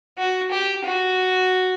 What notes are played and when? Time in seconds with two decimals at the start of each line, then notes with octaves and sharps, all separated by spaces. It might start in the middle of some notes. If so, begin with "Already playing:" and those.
0.18 F#4
0.51 G4
0.85 F#4